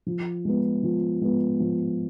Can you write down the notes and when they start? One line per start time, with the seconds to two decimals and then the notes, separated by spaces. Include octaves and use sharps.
0.06 F3
0.45 G#3 B3
0.83 F3
1.22 G#3 B3
1.60 F3